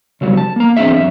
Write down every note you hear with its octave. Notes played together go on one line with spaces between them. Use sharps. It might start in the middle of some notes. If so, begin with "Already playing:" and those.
C#3 F#3 G3
A5
A#3 A#5
E2 C4 D4 G#4 E5
F#2 E5